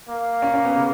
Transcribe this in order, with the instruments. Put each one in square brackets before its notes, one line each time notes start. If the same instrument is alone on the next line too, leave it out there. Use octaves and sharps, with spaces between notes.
[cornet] A#3
[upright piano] C#4
C#4
B3
C#3